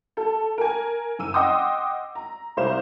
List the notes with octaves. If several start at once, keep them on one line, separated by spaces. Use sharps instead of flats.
A4
A#4 G#5
F#1 E6 D#7
D#5 F#5 G5 C6 D6 D#6
A#5
C2 C5 F5 E7